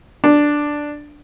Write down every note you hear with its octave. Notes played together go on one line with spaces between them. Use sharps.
D4